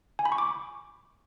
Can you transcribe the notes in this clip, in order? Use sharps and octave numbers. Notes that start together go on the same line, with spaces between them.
G#5
B5
C#6
D6